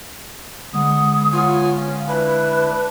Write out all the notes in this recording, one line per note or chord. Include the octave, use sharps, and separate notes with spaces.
D3 G#3 B3 D#6
B3 F4 C#5 G#5
C#4 F5
D4 E4 B4